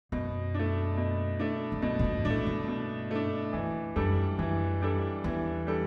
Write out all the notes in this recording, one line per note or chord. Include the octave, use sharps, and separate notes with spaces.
F#2 B2
A3 D4
B2
A3 D4
G2
F#2 B2
A2
G2
A2 A3 D4
G2
B2
A3 D4
F#2 E3
F#2 G3 D4 A4
F#2 E3
G3 D4 A4
E2 E3
G3 D4 A4